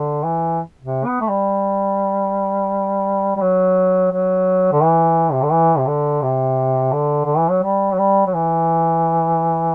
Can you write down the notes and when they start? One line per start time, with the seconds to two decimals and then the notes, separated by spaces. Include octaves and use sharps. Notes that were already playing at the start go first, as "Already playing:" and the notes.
Already playing: D3
0.24 E3
0.82 C3
1.06 B3
1.21 A3
1.29 G3
3.36 G3
3.41 F#3
4.11 F#3
4.72 D3
4.82 E3
5.32 C3
5.43 D3
5.52 E3
5.78 C3
5.87 D3
6.22 C3
6.93 D3
7.25 D3
7.38 E3
7.51 F#3
7.63 G3
7.92 F#3
7.99 G3
8.27 F#3
8.34 E3